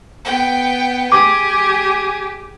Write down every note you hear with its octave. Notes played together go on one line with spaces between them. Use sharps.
B3 G5
G4 G#4 D6